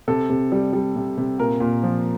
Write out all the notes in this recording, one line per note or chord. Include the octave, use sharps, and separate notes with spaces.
C3 A4
C3
G3
G3
C3
C3
A#2 A#4
A#2
F3